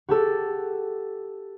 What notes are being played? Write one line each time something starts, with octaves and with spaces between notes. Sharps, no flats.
F#4 G4 A4